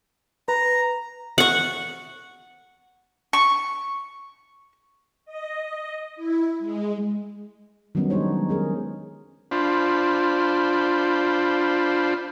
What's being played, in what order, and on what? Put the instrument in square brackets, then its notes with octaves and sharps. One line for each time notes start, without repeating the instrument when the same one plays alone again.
[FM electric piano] B4 [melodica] A#5
[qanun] F#5 C#6
[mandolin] C#6
[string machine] D#5
E4
G#3
[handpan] D#3 F#3 G3 B3 C#4 D#4
G#3 D4 D#4 C5 C#5
C#4 G#4 A#4
[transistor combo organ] D4 F4 C5 B5